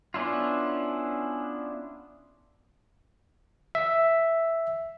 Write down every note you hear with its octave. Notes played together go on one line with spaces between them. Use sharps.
B3 C#4 D4 E4 F4
E5